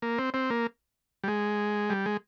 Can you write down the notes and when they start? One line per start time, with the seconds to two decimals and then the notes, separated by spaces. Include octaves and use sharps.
0.02 A#3
0.18 C4
0.34 C4
0.50 A#3
1.24 G3
1.28 G#3
1.90 G3
2.06 G#3